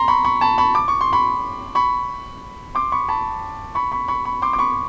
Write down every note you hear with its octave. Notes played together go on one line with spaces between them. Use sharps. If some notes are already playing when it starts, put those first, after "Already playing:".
Already playing: A#5 C6
B5 C#6
B5 C#6
A5 B5
B5 C#6
D6
C#6
C6
B5 C#6
B5 C#6
C6 D6
B5 C#6
A5 B5
B5 C#6
B5 C#6
B5 C#6
B5 C#6
C6 D6
D6
B5 C#6